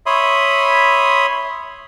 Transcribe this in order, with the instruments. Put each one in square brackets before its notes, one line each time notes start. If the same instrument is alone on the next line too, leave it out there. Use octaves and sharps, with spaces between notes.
[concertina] C#5 E5 B5 C6 D#6